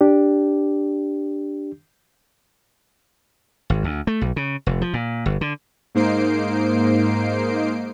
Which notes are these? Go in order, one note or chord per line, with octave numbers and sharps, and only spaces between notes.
D4 G4
G#1
D2
A3
B1
C#3
F1
F3
A#2
G1
D3
G#2 A#3 D#4 C5 C7 D7